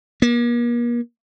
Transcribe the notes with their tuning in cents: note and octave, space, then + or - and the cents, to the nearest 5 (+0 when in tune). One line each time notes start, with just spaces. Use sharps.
A#3 +40